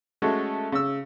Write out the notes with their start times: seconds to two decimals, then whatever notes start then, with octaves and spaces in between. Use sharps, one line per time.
0.22 G#3 A3 C#4 F#4
0.72 C#3 E6